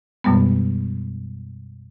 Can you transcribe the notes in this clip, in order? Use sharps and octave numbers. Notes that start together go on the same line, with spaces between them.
F#2 B2 G3 G#3 B3